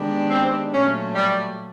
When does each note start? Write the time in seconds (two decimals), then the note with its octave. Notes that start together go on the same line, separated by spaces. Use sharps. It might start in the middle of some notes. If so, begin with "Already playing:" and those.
Already playing: D#3 G#3 B3 D4 G4
0.30 C4
0.73 A#2 F#3 A3 C#4
1.15 G3